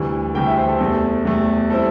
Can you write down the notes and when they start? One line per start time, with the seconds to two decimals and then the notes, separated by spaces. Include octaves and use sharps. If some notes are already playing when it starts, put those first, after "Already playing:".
Already playing: D2 C3 E3 G3
0.35 D2 C3 E3 G3 G5
0.46 E5
0.57 C5
0.69 A4
0.80 E2 C3 A3
1.25 E2 C3 A3
1.70 G3 C4 E4 A4